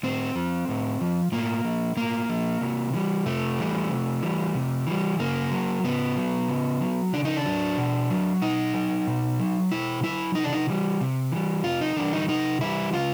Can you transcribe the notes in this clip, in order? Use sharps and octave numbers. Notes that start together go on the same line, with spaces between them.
A2 C4
F3
A2
F3
A2 A#3
F3
A2 A#3
F3
C3
E3 G3
C3 A3
E3 G3
C3
E3 G3
C3
E3 G3
C#3 A#3
F#3
C#3 B3
F#3
C#3
F#3
C#3 D4
D#4
D4
F#3
B2
F#3
B2 D#4
F#3
B2
F#3
B2 E4
F#3 E4
C3 D#4
D4
D#4
E3 G3
C3
E3 G3
C3 F4
D#4
E3 G3 D4
D#4
C3 D#4
E3 G3 E4
C#3 F4